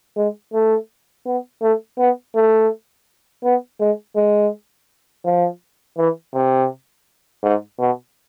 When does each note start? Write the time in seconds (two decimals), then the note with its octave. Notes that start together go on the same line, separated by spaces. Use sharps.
0.17 G#3
0.53 A3
1.26 B3
1.62 A3
1.98 B3
2.35 A3
3.44 B3
3.80 G#3
4.16 G#3
5.25 F3
5.98 E3
6.35 C3
7.43 G#2
7.79 B2